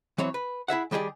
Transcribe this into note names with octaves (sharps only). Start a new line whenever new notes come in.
E3 F#3 C4 C#5
B4
E4 G#4 E5 F#5
D#3 G3 G4 G#4 D5